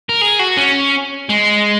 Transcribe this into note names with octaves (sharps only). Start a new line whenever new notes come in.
A#4
G#4
F#4
C#4
G#3